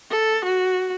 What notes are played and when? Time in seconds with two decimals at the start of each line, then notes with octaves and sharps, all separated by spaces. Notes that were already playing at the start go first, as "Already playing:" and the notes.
0.11 A4
0.45 F#4